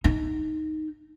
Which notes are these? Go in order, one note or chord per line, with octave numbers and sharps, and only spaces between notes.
D#4